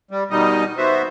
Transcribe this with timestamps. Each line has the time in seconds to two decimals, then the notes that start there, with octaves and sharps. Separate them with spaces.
0.11 G3
0.31 B2 D#3 G3 D#4 D#5
0.77 B3 F#4 C5 E5